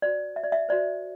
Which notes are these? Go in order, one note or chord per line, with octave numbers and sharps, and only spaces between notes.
F#4 C5 D5
E5
D5
E5
F#4 C5 D5